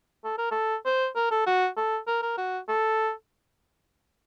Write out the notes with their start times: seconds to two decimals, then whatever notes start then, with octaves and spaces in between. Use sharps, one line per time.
0.24 A4
0.38 A#4
0.52 A4
0.85 C5
1.16 A#4
1.31 A4
1.47 F#4
1.77 A4
2.07 A#4
2.22 A#4
2.37 F#4
2.68 A4